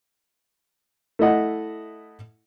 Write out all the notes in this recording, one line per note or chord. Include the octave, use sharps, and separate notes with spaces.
A3 E4 D#5 F#5